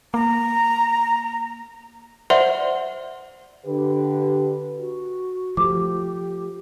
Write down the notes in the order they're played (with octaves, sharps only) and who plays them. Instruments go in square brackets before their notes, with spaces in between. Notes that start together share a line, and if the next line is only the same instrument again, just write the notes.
[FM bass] A#3 [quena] A#5
[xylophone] C5 D5 E5 F#5 C6
[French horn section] D3 G4 B4
[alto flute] F#4
[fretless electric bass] F3 A3 [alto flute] G4 [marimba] D6